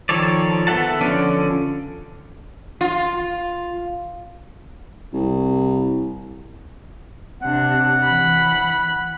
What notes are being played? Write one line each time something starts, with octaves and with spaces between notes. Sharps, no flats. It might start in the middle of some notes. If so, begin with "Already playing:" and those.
D#3 F3 A4 C#5 D5
B3 A4 E5 F#5 A5
D3 F3 C#4 A4 D5
F4
C2
C3 D4 F#5
E3 B5